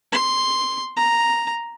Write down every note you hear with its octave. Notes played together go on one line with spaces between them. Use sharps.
C6
A#5